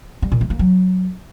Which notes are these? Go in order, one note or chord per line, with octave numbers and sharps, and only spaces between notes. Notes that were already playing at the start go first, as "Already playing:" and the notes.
G3
A#2
A3
A#3
F#3